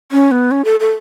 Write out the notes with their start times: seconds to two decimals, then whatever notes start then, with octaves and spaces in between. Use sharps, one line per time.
0.12 C#4
0.31 B3
0.51 C#4
0.65 A4
0.80 A4